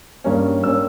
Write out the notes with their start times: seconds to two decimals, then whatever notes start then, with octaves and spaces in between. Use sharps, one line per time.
0.24 G2 G3 A#3 C#4
0.62 G2 G3 A#3 C#4 E6